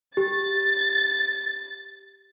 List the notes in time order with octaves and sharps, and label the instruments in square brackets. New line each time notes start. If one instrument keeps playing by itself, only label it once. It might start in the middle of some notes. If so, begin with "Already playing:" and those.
[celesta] G4 [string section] A6